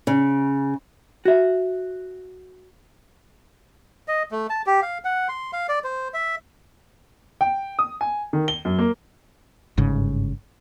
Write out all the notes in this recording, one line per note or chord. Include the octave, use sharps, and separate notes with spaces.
C#3
F#4 E5
D#5
A3
A5
G4
F5
F#5
C6
F5
D5
C5
E5
G5
D#6
G#5
D#3
G7
F#2
A#3
G1 G#2 C#3